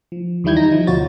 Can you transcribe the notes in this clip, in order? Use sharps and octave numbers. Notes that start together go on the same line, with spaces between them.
F3
E2 D#3 G3 E4 G6 G#6
D#4 A#6
F3
D2 B2 F4 F#4 C#5 A6